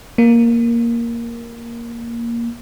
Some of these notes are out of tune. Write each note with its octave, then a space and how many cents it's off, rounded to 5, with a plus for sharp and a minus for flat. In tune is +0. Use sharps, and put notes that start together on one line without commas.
A#3 +5